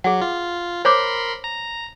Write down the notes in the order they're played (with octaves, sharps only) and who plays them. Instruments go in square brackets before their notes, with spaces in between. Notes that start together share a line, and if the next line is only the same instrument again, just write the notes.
[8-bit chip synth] F#3 [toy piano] G#4 F#5
[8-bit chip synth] F4
[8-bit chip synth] A#4 B5 C6 [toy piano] C5 C#5 D6
[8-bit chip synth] A#5